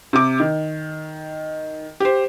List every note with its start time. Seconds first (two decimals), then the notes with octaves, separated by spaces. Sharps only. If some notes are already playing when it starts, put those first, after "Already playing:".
0.13 C3 D6
0.40 D#3
2.00 G4 C5